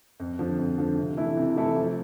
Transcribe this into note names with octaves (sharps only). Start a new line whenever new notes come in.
F2
D3 F3
F2
D3 F3
C3
E3 A3 E4 A4
C3
E3 A3 E4 A4
F3